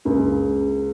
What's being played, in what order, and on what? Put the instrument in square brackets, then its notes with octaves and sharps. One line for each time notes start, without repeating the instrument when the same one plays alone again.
[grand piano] C#2 C#3 A#3